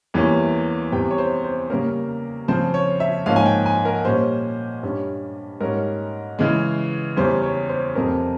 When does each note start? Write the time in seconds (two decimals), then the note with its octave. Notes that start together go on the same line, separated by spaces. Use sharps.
0.14 E2 E3 G3 A#3 C#4
0.92 E2 C3 G3 C4 G5
1.11 C#5
1.18 C5
1.44 C5
1.70 C#3 G3 A#3 C#4 A#4
2.48 C#3 F3 C4 C5
2.74 C#5
3.00 E5
3.26 G#2 F3 A#3 C#4 F5
3.36 G#5
3.46 G5
3.66 G#5
3.85 A#4
4.05 A#2 G3 C#4 C5
4.83 G2 G3 C#4
5.61 G#2 G3 C#4 A#4
6.39 C#3 E3 G#3
7.17 E2 C#3 G3 C#4 C5
7.43 C#5
7.69 C5
7.95 F2 C3 G3 C4 A#4